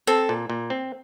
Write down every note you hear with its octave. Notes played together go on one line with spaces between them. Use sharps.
C4 A4
A#2
A#2
C4